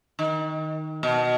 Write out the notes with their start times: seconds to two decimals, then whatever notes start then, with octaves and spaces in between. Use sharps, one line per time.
0.19 D#3
1.03 B2